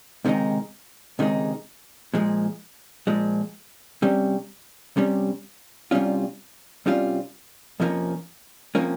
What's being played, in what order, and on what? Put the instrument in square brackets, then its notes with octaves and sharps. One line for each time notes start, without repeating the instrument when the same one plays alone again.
[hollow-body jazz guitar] C#2 C3 D#3 G#3 D#4
C#2 C3 D#3 G#3 D#4
A#2 F3 G#3
A#2 F3 G#3
C3 G3 C#4
C3 G3 C#4
C2 C3 G3 C#4 F4
C2 C3 G3 C#4 F4
F2 C3 F3 A#3 C#4
C3 F3 A#3 C#4